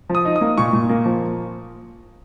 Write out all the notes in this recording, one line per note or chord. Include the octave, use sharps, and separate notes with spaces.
F3
D#6
D#4
D#6
A#3
A#2 C#6
A#2
A#3
F3